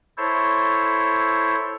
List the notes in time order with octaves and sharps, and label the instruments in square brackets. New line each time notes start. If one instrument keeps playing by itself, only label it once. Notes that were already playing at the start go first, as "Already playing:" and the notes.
[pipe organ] E4 A4 C5 C#5